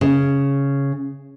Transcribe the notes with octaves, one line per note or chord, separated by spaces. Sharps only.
C#3